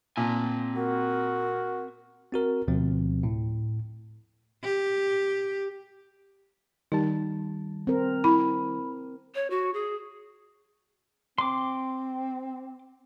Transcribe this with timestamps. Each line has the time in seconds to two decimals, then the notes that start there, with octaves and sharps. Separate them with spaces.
0.17 A#2 C4 G#5 A5
0.76 F#4 A#4
2.32 C4 F#4 A#4
2.68 D2 B2 F3 C4
3.23 A2
4.63 G4
6.92 D#3 G3 D#4 A5
7.87 C4 A#4
8.24 E4 B5
9.35 C#5
9.50 F#4
9.74 G#4
11.38 C4 C6 D6